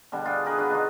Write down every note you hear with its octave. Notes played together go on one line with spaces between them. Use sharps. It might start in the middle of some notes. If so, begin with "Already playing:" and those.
B2 D3 G3
D4 F4 G4 G#4
B3 G#4 A#4 B4
D4 F4 F#4 B4
B2 D#4 F4 F#4